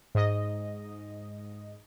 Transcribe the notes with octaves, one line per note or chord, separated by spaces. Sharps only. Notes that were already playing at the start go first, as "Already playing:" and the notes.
G#2 D#5